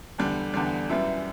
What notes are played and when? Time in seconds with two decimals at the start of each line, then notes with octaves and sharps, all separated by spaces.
0.18 E2 D3 G3
0.54 E2 D3 G3
0.90 F#2 E3 G3 E5